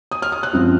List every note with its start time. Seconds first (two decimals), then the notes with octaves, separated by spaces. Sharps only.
0.11 D#6
0.22 F6
0.32 D#6
0.43 F#6
0.53 F#2 F3 C4